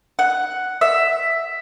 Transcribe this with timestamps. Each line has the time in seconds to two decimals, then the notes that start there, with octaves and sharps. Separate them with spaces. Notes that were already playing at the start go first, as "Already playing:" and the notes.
0.19 F#5
0.81 E5